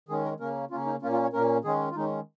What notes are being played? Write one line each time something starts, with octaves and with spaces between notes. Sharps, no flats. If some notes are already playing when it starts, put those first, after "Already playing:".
D#3 G#3 C#4 G#4
A#4
C#3 A#3 C#4 A#4
C#3 A#3 C#4 F4
D#4
A#2 A#3 C#4 F4
F4
C#5
A#2 A#3 C#4 A#4
D#3 G#3 C#4 G#4
F4
D#3 G#3 C#4 D#4